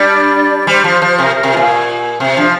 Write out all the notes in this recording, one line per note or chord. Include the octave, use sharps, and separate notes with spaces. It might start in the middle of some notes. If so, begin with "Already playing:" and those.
Already playing: G3 D4 D5
D5
G3 C5
F3
F3
C3 A#4
A#4
C3
A#2 F4
C3
F3 D4